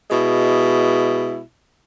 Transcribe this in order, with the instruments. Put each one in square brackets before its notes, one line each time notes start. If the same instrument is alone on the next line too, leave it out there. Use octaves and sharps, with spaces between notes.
[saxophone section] B2 G#3 E4